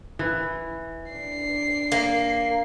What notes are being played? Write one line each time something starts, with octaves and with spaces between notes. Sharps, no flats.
E3
D4 C7
A#3